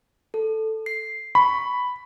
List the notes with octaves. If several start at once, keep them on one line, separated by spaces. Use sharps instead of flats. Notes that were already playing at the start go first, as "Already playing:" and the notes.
A4
C7
B5 C#6